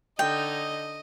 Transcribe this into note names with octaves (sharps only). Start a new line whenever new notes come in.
D3 D#4 D#5 G5